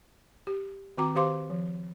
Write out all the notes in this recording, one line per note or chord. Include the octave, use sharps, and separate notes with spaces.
G4
D#3 C4 F#4 A#5 D6
D#3 G4 C5 F5 C6 D6
F3